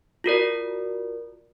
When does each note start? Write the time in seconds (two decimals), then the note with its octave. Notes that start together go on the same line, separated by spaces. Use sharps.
0.24 F4 F#4 A#4 D5